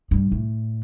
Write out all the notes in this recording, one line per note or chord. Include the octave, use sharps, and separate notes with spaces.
G2
A2